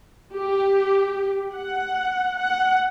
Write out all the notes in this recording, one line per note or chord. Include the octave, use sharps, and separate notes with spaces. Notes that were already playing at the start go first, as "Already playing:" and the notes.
G4
F#5
F#5